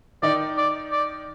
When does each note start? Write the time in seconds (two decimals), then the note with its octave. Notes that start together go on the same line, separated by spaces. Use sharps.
0.22 D#3 D#4 D5
0.57 D5
0.92 D5